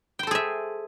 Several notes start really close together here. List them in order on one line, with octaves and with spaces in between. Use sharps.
G5 C5 A4 G#4 E5